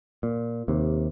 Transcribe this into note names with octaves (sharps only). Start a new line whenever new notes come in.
A#2
D#2 C3